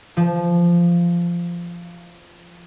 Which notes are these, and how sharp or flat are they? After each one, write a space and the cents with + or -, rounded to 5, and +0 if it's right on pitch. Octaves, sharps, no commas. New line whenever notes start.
F3 -15